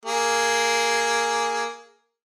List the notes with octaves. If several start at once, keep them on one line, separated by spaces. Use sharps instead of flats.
A#3 G#4